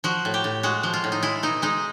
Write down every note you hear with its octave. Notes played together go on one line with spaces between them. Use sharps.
F3 F#4
A2
G4
A2
G#3 F#4
F3
F4
A2
D#4
G#3 E4
B2 D#4
G#3 D#4